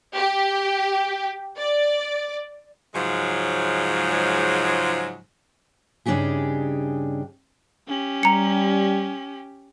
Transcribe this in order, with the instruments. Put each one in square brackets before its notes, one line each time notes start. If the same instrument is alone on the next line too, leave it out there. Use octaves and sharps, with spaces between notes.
[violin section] G4
D5
[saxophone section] G#2 C#3 F3 F#3 G#3
[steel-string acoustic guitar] G2 C#3 D4 D#4 G4 G#4
[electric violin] C#4 G4
[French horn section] G3 [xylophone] A#5 C#7